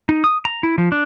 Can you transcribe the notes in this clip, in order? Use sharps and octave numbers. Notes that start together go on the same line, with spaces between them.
D#4
D#6
A#5
E4
F3
D4